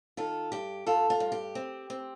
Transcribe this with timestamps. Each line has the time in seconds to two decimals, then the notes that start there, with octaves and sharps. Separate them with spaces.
0.17 D#3 F4 A4
0.52 G2 G4
0.86 G2 F4 A4
1.10 F4
1.20 G2
1.32 G4
1.55 C4
1.90 C4